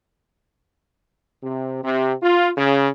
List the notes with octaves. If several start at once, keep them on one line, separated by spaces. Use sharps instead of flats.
C3
C3
F4
C#3